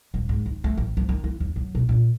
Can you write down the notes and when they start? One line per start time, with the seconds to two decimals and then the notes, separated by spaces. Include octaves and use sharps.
0.14 D#1
0.29 G#2
0.46 D#2
0.64 A3
0.77 A1
0.97 F3
1.09 D#3
1.24 E4
1.40 D#2
1.56 F#2
1.75 B2
1.89 A#2